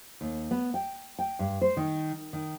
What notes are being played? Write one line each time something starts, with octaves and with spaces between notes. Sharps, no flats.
D#2
B3
G5
G5
G2
C5
D#3
D#3